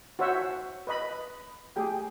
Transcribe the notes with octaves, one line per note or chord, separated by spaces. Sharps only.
F#4 C5 C#5 E5 F#5
B4 D#5 B5
A3 G4 G#4 G5